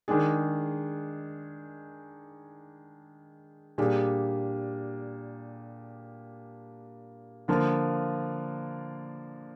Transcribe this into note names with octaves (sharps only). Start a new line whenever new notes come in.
D#3 G#3 D4 G#4
A#2 G3 D4 G#4
D3 F3 A#3 F4